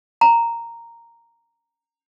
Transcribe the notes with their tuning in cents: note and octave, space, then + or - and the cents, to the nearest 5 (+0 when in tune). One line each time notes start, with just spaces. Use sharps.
A#5 -5